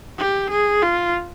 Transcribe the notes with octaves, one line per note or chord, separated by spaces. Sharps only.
G4
G#4
F4